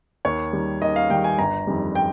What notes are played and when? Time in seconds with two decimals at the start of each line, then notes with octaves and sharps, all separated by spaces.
0.25 D#2 C#5
0.53 D#3 G3
0.82 D#2 D#5
0.96 F5
1.10 D#3 G3 G5
1.24 G#5
1.38 G1 A#5
1.67 F2 D#3 G3
1.95 G5